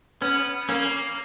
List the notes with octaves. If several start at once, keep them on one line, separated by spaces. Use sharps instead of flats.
B3 C#4
A#3 C#4